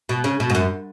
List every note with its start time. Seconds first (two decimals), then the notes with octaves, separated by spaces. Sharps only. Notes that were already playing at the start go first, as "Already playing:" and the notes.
0.09 B2
0.24 C#3
0.40 B2
0.50 G#2
0.55 F#2